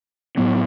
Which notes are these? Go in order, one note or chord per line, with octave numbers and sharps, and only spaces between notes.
A2 F#3 B3